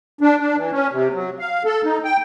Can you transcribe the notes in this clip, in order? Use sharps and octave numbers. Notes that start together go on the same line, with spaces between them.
D4
D4
E3
C#4
C3
F#3
F5
A4
D#4
G5